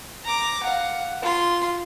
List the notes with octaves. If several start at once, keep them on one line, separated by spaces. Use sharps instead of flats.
A#5 D6
F5 F#5
F4 C6